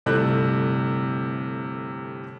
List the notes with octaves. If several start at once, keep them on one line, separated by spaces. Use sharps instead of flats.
G1 A2 C3 A4 F#6